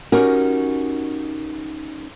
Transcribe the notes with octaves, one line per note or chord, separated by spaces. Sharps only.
C#4 D#4 F#4 G4 A#4